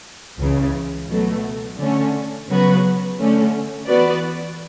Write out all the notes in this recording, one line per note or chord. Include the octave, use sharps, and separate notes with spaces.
C#2 C#3 E3
B2 F#3 A3
D3 A3 C#4
C#3 F#3 B3 F#4 B4
D3 A3 C#4
E3 B3 F#4 B4 D5